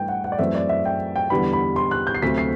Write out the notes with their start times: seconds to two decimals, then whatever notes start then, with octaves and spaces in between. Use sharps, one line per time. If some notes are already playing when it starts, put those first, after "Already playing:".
Already playing: G2 E3 A3 G5
0.09 F#5
0.24 F#5
0.32 D5
0.39 F#2 E3 A3 C4 E5
0.55 D5
0.69 E5
0.85 G5
1.16 G5
1.30 E2 D3 G3 B3 B5
1.53 B5
1.76 C6
1.91 F#6
2.07 G6
2.15 C7
2.22 D2 C3 F#3 A3 C4 B6
2.38 C7